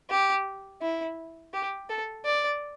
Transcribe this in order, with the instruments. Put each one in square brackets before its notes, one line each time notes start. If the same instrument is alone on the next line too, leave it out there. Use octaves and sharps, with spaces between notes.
[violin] G4
E4
G4
A4
D5